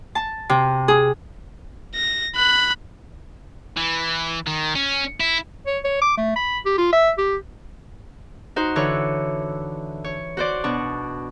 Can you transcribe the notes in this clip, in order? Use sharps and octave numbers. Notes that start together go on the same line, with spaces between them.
A5
C3
G#4
A#6
B5 F#6
E3
D#3
C#4
E4
C#5
C#5
D6
A3
B5
G4
F4
E5
G4
D#4 F#4 C5
D3 E3 C#5
C#5
F#4 C5 D5
B2 D4 C#6